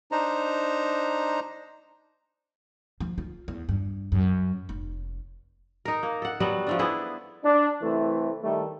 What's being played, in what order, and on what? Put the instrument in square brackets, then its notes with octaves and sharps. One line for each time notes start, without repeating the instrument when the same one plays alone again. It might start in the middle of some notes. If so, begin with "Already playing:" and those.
[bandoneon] D4 D#4 C5 A#5
[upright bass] F3
F4
E2
G2
F#2
F1
[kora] D#4 A#4
A#3
A4 F#5
F#3 G3 B3 F#4
F3 A3 D4
B3 E4 G#4 A4
[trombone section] D4
C2 E3 A3 C4
D#3 G3 A3